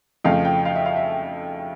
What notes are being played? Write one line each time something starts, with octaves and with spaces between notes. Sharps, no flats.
F2 C#3 F3 A3 F5
G5
F5
E5
F5
E5